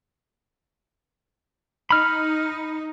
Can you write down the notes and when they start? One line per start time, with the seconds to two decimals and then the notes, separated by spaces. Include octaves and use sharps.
1.91 D#4 B5 F6